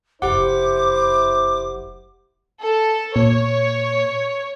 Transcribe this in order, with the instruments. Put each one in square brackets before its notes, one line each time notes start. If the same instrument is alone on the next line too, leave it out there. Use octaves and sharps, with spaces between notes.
[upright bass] F1 F#2 [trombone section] E4 C5 [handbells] G4 F#5 [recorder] D6
[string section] A4
[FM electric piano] A#2 [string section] C#5